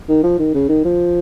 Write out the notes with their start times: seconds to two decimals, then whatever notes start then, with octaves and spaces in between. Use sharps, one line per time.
0.09 D#3
0.23 F3
0.39 D#3
0.54 C#3
0.69 D#3
0.85 F3